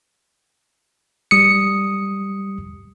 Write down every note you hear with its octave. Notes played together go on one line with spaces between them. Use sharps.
G3 D#6 C#7